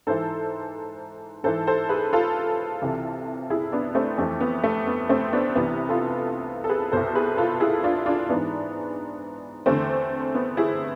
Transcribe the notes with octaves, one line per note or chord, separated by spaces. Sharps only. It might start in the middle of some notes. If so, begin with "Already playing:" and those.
G#2 E3 A4 C5
G#2 E3 A4 C5
A4 C5
G#4 B4
F4 A4
C2 C3 E3
E4 G#4
B3 D4
A3 C4
F2 E3 A3
B3
A3
B3
A3 C4
B3 D4
C2 C3 E3 B3
F4 A4
A4
G#4 B4
C2 B2 A4 C5
G#4 B4
F4 A4
E4 G#4
D4 F4
D4 F4
G#2 E3 B3 D4
E2 D3 A3 C4
B3
E4 G#4